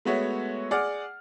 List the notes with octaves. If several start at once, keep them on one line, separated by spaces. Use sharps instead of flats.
G#3 A3 B3 F#4 C#5 E5
G#4 D5 F#5 D6 F6